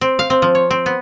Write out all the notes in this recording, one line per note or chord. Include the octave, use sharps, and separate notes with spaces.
C4
F5
C4
F3
C#5
C4
B3